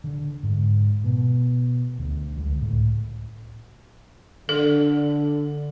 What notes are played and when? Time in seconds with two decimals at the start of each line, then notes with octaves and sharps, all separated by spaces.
0.04 D3
0.43 G#2
1.04 B2
1.99 D2
2.37 C#2
2.61 A2
4.49 D3 A4